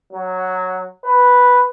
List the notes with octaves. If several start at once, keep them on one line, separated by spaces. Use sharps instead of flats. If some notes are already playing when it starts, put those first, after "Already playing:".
F#3
B4